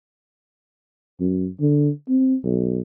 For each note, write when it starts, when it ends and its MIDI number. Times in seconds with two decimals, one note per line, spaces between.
1.20 1.47 42
1.60 1.90 50
2.08 2.35 60
2.44 2.82 35